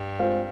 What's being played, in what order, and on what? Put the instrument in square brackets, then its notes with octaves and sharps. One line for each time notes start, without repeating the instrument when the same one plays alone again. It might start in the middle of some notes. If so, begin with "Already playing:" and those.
Already playing: [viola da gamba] G2
[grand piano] G#3 C4 F4 C5 F5